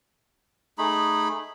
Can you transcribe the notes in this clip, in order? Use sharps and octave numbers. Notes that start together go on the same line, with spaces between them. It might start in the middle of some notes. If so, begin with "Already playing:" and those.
A3 D#4 G#4 B5